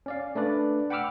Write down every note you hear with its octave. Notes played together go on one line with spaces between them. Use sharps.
C#4 D5 F5
A3 D4 B4 D5
F#5 G5 B5 D6 E6 F6